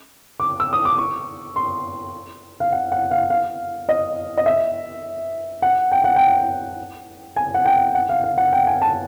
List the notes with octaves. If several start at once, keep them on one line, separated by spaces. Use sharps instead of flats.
D6
E6
D#6
D6
C#6
C6
F5
F#5
F#5
F5
F5
D#5
D#5
E5
F#5
G5
F#5
G5
G#5
F#5
G5
F#5
F5
F5
F#5
G5
G#5
A5